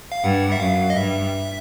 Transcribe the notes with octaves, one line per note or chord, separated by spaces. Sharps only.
F5
G2 F#5
E5
F#2 F5
D#5
G2 E5